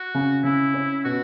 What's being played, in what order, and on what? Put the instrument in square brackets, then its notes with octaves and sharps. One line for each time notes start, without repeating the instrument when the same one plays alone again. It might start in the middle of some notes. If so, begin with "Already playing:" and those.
Already playing: [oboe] F#4
[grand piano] C#3
[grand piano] C#3 [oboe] E4
[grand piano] C#4
[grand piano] B2 [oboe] F#4